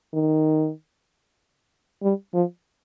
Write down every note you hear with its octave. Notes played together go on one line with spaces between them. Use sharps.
D#3
G3
F3